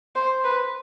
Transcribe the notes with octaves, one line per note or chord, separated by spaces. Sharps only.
C5
B4